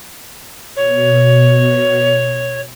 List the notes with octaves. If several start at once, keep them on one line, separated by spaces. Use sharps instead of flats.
B2 C#5